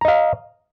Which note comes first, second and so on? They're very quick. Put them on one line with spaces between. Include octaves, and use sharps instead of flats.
A#5 D#5 F5